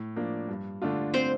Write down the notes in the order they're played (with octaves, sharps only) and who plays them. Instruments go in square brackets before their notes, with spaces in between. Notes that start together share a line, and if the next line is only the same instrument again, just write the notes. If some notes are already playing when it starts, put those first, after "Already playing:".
Already playing: [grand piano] A2
F3 A#3 D4
G2
D3 A3 D4 F4
[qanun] C4 C5